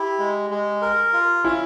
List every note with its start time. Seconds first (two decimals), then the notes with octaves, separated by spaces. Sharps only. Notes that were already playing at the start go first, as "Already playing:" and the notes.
Already playing: E4 G4
0.19 G#3
0.50 G#3
0.82 A#4
1.13 F4
1.45 C#4 E4